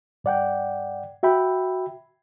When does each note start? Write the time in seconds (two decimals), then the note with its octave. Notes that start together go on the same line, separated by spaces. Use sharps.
0.24 G2 D5 F#5 G5
1.23 F#4 E5 G5 B5